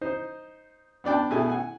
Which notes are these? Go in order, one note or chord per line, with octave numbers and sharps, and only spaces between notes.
D#4 C5
B3 D4 D5 G5 A5
B2 A3 E4 G#4 G#5
F#5 G#5